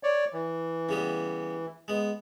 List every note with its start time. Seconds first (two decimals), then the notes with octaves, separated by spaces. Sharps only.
0.03 C#5 D5
0.33 E3
0.89 C#3 G3 B3
1.88 G#3 B3